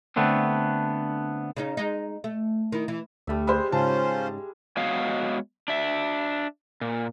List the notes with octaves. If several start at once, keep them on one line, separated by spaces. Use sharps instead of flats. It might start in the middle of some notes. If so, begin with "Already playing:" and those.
D3 A3 B3 C4 D4
C#3 C#4 D#4
G#3 D#4
A3
D#3 E4
E3
D2 G3 A3 E5
G3 G#3 G#4 C5 B5
G#2 C#3 C#4 F4 C5 A5
G#3 B3 F#4 C#5 D#5 F5
D4 E5
A#2